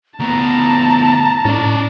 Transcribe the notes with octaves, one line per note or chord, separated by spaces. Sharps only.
D2 B3 A5 A#5
A2 C#4 D5